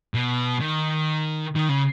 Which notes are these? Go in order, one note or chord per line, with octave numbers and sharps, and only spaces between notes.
B2
D#3
D#3
C#3